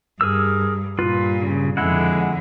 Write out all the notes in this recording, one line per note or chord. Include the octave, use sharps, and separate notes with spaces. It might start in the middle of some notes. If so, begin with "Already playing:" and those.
G2 G#4 A#4 E6
G2 A#2 F4 B4
C#3
F2 D3 G#3 E4 F#5